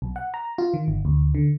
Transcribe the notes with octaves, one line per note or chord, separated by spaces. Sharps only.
B1
F#5
A#5
F4
D#3
G1
D2
D3